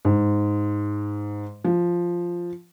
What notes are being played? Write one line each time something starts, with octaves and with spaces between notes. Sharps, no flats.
G#2
F3